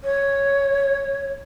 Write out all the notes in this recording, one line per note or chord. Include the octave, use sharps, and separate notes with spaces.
C#5